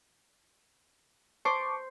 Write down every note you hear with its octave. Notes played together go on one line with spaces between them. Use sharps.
C5 A5 C#6 D6